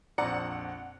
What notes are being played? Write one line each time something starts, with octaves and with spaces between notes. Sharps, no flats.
A#1 F2 D5 F#5 A#5 C#7